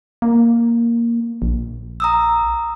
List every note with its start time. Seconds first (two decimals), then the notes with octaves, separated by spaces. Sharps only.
0.22 A#3
1.42 A#1
2.00 A#5 D#6 E6